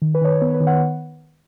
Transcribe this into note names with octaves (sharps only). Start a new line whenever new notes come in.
D#3
B4
D#3 C#5
B4
B3 C#5
B4
D#3
F#5